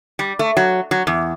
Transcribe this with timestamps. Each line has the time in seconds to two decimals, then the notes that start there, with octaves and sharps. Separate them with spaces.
0.19 G3
0.39 A3
0.57 F#3
0.91 F#3
1.07 E2